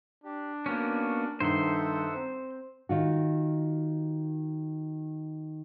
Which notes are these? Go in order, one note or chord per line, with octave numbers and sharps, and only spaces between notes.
D4 G4
A#3 B3 C#4 F#4 A#4
G2 D#3 D#4 A4 C5 E5 F#5 C6
C4
D#3 F4 F#4